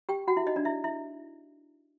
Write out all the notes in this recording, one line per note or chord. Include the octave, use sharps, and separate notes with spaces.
G4 G5
F#4 F#5
E4 E5
D#4 D#5
D4 D5
E4 E5
E4 E5